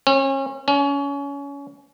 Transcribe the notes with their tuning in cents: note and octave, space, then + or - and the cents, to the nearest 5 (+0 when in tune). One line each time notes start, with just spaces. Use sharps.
C#4 -35
C#4 +25